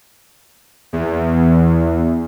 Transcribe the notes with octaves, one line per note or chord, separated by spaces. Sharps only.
E2